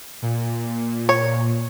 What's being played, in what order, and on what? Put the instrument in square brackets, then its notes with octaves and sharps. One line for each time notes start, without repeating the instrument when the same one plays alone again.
[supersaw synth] A#2
[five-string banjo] C#5